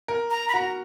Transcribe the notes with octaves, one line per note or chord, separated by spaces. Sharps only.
A#4
A#5
B5
F#4 A#5